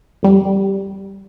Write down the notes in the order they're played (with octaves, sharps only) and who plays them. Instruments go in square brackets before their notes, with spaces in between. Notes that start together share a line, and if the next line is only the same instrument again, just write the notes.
[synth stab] F2 G3